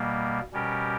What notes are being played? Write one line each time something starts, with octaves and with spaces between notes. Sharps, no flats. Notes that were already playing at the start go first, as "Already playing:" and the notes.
Already playing: B2 G3 A#3
B2 G3 C#4 G4 A#4